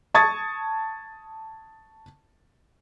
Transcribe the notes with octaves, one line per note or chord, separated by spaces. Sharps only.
A5 C#6 D#6 G#6 A6